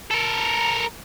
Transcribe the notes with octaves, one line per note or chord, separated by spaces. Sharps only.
A4 A#4